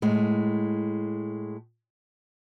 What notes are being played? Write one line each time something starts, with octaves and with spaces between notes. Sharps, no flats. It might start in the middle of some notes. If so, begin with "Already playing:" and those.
A2 G#3